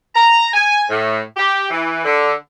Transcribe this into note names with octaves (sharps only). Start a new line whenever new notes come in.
A#5
G#5
A2
G4
E3
D3